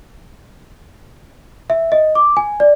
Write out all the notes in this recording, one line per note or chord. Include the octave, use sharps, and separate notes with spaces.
E5
D#5
D6
G#5
D5